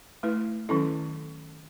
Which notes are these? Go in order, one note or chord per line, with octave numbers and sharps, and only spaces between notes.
A3 E4 B4
D#3 F#3 C#4 E4 A4